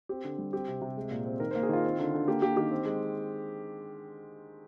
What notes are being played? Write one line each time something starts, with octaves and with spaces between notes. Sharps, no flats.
C4 G4
D3
G3
C4 G4
C3
C3
G#3
A#2
C4
D#3 A#4
A#3 C5
G#4
D#3 F4
C4
D3
D3
A#3 G4
A#3 G4
D#3 G4
C4
G#3